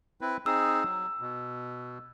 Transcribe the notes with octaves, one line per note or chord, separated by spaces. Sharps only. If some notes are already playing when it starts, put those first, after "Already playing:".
C4 E4 B4
C4 D#4 G#4 E6
F#3
B2